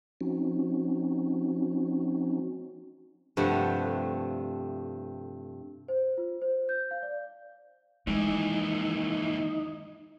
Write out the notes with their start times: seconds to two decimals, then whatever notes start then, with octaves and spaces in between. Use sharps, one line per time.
0.21 F3 C4 C#4 D#4 F#4
3.37 G2 C3 F3 A3 F#5
5.88 C5
6.18 F4
6.42 C5
6.69 G6
6.91 F5
7.02 D5
8.07 D#2 E3 F3 G#3 D#4